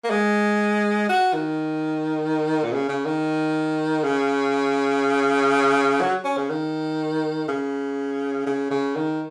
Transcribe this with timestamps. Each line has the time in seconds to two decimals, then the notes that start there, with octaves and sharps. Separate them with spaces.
0.04 A#3
0.11 G#3
1.09 F#4
1.34 D#3
2.64 A#2
2.73 C#3
2.89 C#3
3.06 D#3
4.04 C#3
6.01 F#3
6.25 C#4
6.37 C#3
6.50 D#3
7.48 C#3
8.47 C#3
8.71 C#3
8.96 D#3